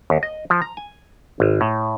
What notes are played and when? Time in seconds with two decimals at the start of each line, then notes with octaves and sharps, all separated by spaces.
0.10 D#2
0.23 D#5
0.50 F3
0.62 A#5
0.77 G#5
1.40 G#1
1.61 A2